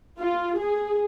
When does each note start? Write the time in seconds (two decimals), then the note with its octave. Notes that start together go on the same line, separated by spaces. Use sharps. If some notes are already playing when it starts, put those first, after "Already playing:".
0.19 F4
0.58 G#4